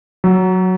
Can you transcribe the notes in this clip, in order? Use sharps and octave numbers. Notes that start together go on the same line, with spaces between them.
F#3